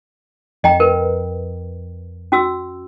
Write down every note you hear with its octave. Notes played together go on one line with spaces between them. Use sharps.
F2 D#5 G5 A#5
A#4 B4
C#4 F#4 E6